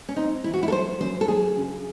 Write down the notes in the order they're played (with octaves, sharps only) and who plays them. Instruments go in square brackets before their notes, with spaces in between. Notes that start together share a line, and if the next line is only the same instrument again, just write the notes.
[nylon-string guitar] C#4
[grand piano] C4 [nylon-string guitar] D#4
[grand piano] E3 [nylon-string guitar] E4
[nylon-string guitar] F#4
E4
A4
[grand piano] F#3 [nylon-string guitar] C5
[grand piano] F#2 [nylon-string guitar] C5
[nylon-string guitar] A4
[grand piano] F#3 [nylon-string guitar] G#4
[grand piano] C#3